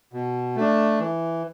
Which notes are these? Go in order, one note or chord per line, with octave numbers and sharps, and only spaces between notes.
B2
A3 D4
E3